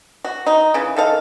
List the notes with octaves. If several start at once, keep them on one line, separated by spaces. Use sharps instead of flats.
F#4
D#4
C#3 E3
D#3 A4 F5